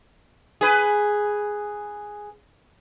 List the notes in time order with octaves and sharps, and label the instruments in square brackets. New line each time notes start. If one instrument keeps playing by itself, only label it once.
[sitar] G#4 B4